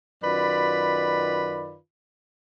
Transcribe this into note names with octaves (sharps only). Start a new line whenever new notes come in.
F#2 D#3 F4 B4 D5 B5